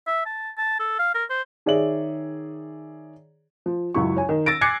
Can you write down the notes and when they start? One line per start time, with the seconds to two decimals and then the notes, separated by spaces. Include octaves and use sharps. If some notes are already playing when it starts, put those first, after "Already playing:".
0.07 E5
0.26 A5
0.58 A5
0.80 A4
0.99 F5
1.14 A#4
1.30 C5
1.66 D#3 G#4 C#5 D5 E5 F#7
3.66 F3
3.94 C#2 F#2 E4 C#6
4.17 C#5 G#5
4.29 D#3
4.46 E6 A6 A#6 D7
4.61 G#5 D6 F#6 G#6 C7 C#7